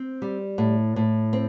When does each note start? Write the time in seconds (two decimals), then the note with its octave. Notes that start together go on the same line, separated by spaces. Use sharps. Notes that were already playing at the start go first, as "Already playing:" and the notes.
Already playing: C4
0.22 G3
0.58 A2
0.96 A2
1.33 C4